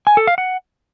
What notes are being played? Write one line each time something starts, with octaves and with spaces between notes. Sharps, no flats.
G#5
A4
F5
F#5